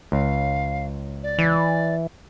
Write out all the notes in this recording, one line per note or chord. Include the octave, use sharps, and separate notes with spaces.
C#2 F5
D5
E3